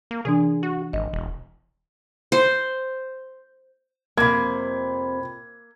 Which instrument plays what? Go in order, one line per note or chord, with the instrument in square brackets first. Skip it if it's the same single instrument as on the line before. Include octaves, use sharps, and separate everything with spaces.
[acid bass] A#3
[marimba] C3 E3 D4 [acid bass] G#4
[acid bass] F#4
[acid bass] G#1 [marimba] D#5
[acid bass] E1
[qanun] C5
[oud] F2 C3 [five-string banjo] A#3 [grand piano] B5 G#6